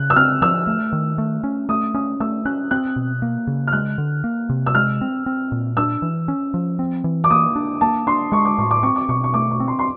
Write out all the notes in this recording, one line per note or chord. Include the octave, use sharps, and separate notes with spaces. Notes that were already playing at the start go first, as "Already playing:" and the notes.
Already playing: C#3 F#6
E6
C4 F6
F3 E6
A3
D#3
A3
C#4
A3 D#6
C#4 D#6
A3 E6
C#4 F#6
C4 F#6
B2
A#3
C#3
F6
G#3 F#6
D3
A#3
C3
E6
G#3 F6
C4
C4
A#2
D4 E6
E3
C#4
F3
C4
E3
D6
A#3 D#6
D4
A#3 A5
D4 C6
G#3 C#6
D6
A2 C#6
D6
C4 C#6
D6
B2 C#6
C#6
A3 D6
C#6
C4
C6
C6